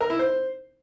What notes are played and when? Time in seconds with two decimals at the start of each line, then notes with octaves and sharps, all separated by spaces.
0.01 A#4
0.10 E4
0.19 C5